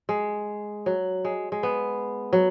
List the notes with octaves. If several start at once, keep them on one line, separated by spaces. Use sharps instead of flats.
G#3
F#3
G#3
G#3
B3
F#3